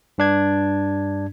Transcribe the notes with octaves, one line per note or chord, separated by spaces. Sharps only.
G2 D4 G#6